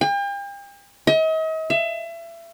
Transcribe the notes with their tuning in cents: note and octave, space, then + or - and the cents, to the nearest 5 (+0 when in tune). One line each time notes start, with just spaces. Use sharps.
G5 +40
D#5 +40
E5 +30